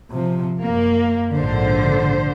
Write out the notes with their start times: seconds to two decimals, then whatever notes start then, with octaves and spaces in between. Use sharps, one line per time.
0.11 C3 F3
0.64 F#2 A#3
1.35 A#1 G#2 D3 C5